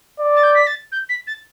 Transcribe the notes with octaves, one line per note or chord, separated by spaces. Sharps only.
D5
A6
G6
B6
A6
G6
B6
A6